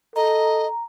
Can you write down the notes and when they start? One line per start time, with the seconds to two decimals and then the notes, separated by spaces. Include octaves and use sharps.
0.16 A4 D#5 A#5